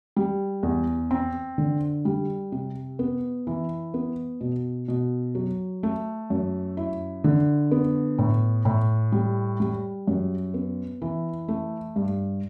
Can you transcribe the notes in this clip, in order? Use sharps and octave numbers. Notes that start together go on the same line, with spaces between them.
G3
E2
C4
D3
G3
C3
B3
E3
B3
B2
B2
F#3
A3
F#2
E4
D3
B3
A2
A2
G3
G3
F#2
B3
E3
A3
G2